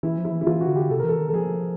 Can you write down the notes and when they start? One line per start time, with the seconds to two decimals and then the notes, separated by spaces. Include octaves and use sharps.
0.03 E3 E4
0.18 F3
0.25 E4
0.32 E3
0.41 E4
0.46 E3 F4
0.61 F#4
0.68 D3
0.76 G4
0.90 C3 A4
0.99 A#4
1.04 E3 A4
1.19 D#3
1.29 A4
1.33 F3 G#4